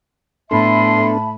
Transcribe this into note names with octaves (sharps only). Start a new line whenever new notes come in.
A2 B3 D4 A4 E5 A5 B5 C6